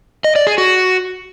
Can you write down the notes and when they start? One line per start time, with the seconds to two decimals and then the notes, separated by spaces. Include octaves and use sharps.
0.24 D#5
0.36 D5
0.47 G#4
0.58 F#4